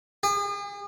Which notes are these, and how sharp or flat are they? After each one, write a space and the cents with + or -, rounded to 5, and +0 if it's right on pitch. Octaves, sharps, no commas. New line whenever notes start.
G#4 -40